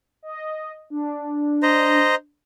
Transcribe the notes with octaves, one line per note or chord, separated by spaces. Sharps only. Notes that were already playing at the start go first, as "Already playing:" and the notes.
D#5
D4
C5 D#5 A#5